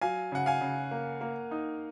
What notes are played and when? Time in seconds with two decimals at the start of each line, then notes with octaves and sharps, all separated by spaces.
0.01 F#3 F5 G#5
0.32 C#3 F#5
0.46 F5 G#5
0.61 C#3
0.91 A#3
1.21 A#3
1.51 D#4